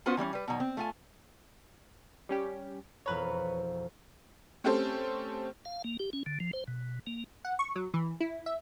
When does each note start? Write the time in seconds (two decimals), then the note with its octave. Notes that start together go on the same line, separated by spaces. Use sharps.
0.06 B3 C#4 F4 F#4 B4 C5
0.17 E3 G3 C4 C#4
0.33 G3 B4
0.48 B2 D#3 F#3
0.60 C4
0.77 A3 F4 G#5
2.29 G3 C#4 G4
3.06 E1 F2 B4 C#5 A#5
4.64 A3 C4 C#4 G4 A4 C5
5.65 F5
5.84 A#3
6.00 G4
6.13 C#4
6.26 D3
6.40 F3
6.53 C5
6.68 B2
7.07 A#3
7.45 F#5
7.59 C#6
7.76 F#3
7.94 E3
8.20 E4
8.46 E5